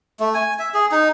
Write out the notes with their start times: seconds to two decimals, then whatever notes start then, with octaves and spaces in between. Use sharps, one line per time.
0.20 A3
0.34 G#5
0.59 E5
0.74 G#4
0.92 D#4